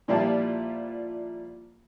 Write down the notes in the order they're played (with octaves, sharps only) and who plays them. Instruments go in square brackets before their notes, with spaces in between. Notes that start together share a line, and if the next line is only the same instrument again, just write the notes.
[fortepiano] A#2 F3 G3 E4 F4 A5